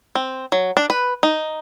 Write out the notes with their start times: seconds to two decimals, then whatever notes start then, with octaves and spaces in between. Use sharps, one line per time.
0.15 C4
0.52 F#3
0.77 D4
0.90 B4
1.23 D#4